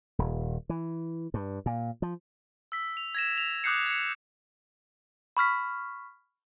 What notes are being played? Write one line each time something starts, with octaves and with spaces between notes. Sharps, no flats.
D#1
E3
G2
A#2
F3
E6 B6
F7
G#6 A#6 E7
F7
D6 D#6 F#6 G6 C7 C#7
G#6 C#7
B5 C#6 F6 B6